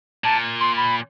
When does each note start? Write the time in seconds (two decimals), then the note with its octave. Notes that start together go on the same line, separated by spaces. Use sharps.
0.24 A#2 A5
0.60 C6
0.77 B5